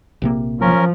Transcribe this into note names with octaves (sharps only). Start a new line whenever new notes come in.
A#1 C3 A#3
F3 C#4 A#4